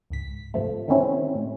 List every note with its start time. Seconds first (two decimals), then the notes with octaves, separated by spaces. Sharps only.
0.10 C#2 G#2 B6
0.54 G#2 C3 F3 A3
0.88 D3 D#3 G3 C4 C#4 E4
1.35 A2